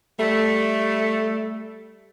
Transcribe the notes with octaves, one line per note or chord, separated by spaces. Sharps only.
G3 A3